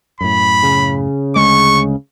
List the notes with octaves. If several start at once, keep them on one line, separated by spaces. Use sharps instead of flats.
F#2 A2 B5
C#3
D2 G#3 C#6